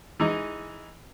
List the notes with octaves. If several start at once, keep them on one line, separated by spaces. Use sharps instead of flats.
E3 G#3 D#4